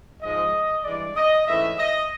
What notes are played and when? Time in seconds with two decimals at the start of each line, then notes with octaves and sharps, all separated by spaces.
0.22 G#2 F3 G#3 D#5
0.84 G2 E3 G#3 D5
1.16 D#5
1.47 G#2 E3 A3 C#4 E5
1.79 D#5